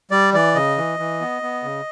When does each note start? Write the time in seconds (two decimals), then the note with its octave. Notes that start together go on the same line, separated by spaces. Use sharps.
0.11 G3 D5
0.34 E3 D5
0.55 C#3 D#5
0.78 E3
0.99 E3
1.21 B3
1.42 B3
1.63 C#3